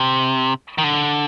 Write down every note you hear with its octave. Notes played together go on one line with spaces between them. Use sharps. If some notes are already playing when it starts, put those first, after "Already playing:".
Already playing: C3
D#3
D3